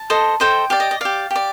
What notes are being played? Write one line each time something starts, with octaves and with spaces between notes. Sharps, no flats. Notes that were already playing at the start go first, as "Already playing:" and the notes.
Already playing: A5
A4 C5 D#5
A4 C5 D#5 G5
G4 D5 F5
D#5
D#5
G4 D5 F5
G4
D5